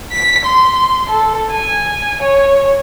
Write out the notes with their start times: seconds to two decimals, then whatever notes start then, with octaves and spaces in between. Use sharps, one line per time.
0.12 B6
0.45 C6
1.09 A4
1.51 G#5
2.22 C#5